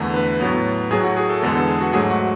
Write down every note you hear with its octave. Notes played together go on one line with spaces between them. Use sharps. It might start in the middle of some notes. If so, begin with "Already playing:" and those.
Already playing: E2 D3 A3
B4
A2 F#3 B3
A2 F#3 A3 G#4
F#4
G#4
A4
E2 D3 G#3 B3 A4
A4
G#4
F#4
G#2 F#3 A3 G#4
F#4